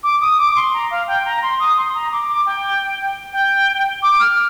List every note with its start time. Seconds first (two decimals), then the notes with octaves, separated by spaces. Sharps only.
0.03 D6
0.21 D#6
0.39 D6
0.56 C6
0.74 A#5
0.91 F5
1.07 G5
1.26 A#5
1.43 C6
1.60 D#6
1.77 C6
1.95 A#5
2.12 D6
2.29 D6
2.46 G5
3.33 G5
4.03 D6
4.20 F6